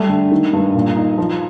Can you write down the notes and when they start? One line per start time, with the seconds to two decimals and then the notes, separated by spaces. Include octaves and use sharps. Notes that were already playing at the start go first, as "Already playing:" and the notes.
Already playing: G3 A3
0.09 D3
0.31 D#3
0.53 G2
0.75 A#2
0.96 D#4
1.18 F3